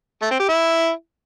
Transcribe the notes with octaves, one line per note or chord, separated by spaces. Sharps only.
A3
C4
G4
E4